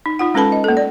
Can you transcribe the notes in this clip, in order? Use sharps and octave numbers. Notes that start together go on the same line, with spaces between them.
D#4
D#4 F4 F#5
G#3 C#4 A4 B4 A5 B5
D#5
A#3 A4
D5